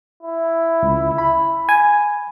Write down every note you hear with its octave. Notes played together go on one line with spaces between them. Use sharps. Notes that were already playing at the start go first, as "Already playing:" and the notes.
E4
C#2
B5
G#5